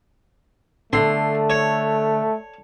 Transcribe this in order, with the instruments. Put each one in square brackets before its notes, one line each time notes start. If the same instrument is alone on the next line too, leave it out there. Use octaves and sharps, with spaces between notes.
[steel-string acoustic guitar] D3 [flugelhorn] A3 [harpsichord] C6
[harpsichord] C#5